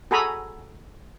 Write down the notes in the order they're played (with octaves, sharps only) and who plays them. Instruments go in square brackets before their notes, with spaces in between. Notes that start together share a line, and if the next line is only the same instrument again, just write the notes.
[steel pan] F#4 G#4 A4 G#5 A#5 B5